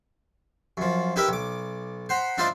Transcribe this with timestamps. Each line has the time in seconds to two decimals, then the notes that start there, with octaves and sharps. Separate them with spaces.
0.77 F#2 F3
1.16 D#4 E4 G4 A#4 B4 E5
1.28 B1 D6
2.09 C5 F#5 A#5 B5
2.38 D4 E4 F4 C5 D5 D#5